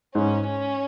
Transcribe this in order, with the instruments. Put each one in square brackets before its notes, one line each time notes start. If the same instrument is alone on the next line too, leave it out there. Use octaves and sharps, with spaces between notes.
[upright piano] G#2 [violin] C#4
[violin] C#4